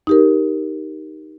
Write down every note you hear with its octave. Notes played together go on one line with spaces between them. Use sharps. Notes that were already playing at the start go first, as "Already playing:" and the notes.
D#4 G4 A#4